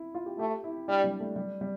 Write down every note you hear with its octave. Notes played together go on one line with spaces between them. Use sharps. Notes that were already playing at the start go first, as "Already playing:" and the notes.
Already playing: E4
F4
G4
A3 G4
E4
G3 D4
G3
A3
G3
G3